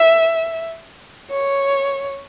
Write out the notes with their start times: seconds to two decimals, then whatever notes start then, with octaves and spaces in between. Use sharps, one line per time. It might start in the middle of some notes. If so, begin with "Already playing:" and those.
Already playing: E5
1.30 C#5